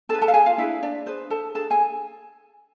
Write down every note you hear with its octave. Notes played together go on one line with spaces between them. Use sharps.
D4 G#4 A4 B4 A5
A4 A5
F5
G#4 G#5
F4 F5
D4 E4 G#4 B4 E5
D4 D5
D4 G#4 B4 C5
A4 A5
D4 G#4 A4 A5
G#4 G#5